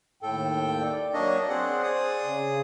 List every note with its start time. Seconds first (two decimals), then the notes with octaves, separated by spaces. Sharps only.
0.23 D#2 A2 A4 G5
0.83 D5
1.14 F#3 A#3 D4 C#5 D#5
1.49 C4 G#4 C5 F#5
1.83 G#4 D#6
2.24 C#3